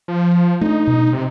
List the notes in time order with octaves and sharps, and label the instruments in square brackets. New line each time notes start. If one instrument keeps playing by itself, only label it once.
[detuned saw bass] F3
[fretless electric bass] A3 D4 [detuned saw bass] D#4
[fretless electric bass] B2
[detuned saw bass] C3